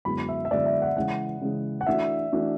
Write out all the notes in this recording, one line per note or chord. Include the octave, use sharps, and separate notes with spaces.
F#2 D3 G#3 B3 E4 B5
E5
E5
F#2 D3 G#3 B3 E4 D5
E5
F#5
C#3 E3 G#3 F#5
C#3 E3 G#3
F#5
E3 A3 D4 F#4 E5
E3 A3 D4 F#4